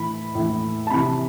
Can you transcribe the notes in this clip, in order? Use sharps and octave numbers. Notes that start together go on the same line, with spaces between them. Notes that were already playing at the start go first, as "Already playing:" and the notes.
Already playing: A2 E3 B5
A2 E3
A5
C3 E3 B5